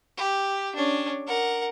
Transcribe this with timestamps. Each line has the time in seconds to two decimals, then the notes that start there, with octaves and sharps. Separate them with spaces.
0.17 G4
0.75 C#4 D4
1.27 A#4 F#5